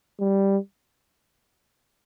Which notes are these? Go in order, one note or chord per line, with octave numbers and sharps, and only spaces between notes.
G3